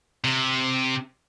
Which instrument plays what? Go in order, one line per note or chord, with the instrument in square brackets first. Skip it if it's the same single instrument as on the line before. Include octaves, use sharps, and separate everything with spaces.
[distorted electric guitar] C3